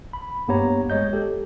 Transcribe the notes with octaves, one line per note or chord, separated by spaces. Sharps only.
B5
G2 A#3 B3 G4 C#5 A#5
G#3 C#5 D#5 G6
G4 A4